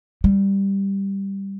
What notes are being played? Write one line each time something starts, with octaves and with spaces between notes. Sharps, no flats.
G3